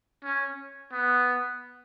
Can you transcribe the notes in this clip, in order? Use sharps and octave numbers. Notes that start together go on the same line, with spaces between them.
C#4
B3